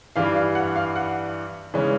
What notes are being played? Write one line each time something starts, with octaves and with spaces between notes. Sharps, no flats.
G2 E3 G3 F5
F5
F#5
F5
F#5
C#3 E3 G#3 C#4